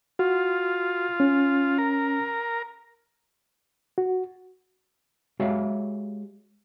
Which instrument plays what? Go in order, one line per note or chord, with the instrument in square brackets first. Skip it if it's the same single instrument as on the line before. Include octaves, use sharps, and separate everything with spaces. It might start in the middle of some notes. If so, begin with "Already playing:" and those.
[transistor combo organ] F4 [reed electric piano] F#4
[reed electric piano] C#4
[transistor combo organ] A#4
[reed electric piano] F#4
[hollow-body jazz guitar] G#3 F#4 G4 C#5 E5 F5